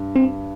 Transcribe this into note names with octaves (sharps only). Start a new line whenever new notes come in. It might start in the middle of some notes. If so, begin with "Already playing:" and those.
Already playing: G2
C4